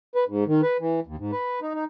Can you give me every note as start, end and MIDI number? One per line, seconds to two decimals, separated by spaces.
0.15 0.24 71
0.28 0.44 44
0.47 0.61 51
0.63 0.77 71
0.80 1.00 52
1.07 1.16 39
1.18 1.31 44
1.32 1.60 71
1.62 1.74 63
1.74 1.84 63